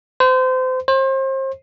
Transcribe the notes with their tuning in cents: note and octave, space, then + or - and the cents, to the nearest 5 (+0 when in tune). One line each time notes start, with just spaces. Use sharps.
C5 -30
C5 +35